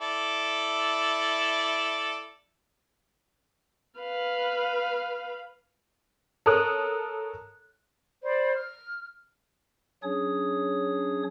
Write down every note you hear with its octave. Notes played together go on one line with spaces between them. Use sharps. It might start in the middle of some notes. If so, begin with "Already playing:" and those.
E4 A4 D5
B4 F5
A4 A#4 C#5 D#6 F#6
C5 D5 B5
F6
F#3 C#4 D4 G#4 C#5 D#6